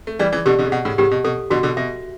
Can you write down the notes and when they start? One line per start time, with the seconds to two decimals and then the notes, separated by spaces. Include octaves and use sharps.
0.07 A3
0.19 E3 G3 D5
0.32 C#3 E3
0.46 B2 D3 G4
0.59 B2 D3
0.66 C#3
0.72 B2 F#5
0.85 A2 C#3
0.98 A2 C#3 G4
1.11 B2
1.24 B2 A4
1.50 B2 D3 F#4
1.63 B2 D3
1.77 B2 E5